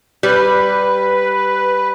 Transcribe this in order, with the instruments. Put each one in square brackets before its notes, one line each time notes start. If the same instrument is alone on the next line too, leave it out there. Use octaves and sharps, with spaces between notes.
[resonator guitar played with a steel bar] G3 [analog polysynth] B4